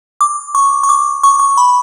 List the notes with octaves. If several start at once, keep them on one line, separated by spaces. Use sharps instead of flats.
D6
C#6
C#6
D6
C#6
C#6
B5